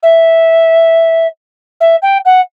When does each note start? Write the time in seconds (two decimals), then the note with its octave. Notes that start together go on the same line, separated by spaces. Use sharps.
0.02 E5
1.80 E5
2.02 G5
2.25 F#5